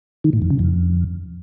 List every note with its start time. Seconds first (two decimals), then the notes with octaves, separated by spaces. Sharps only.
0.24 D#3
0.33 A2
0.42 F2
0.50 C#3
0.59 F2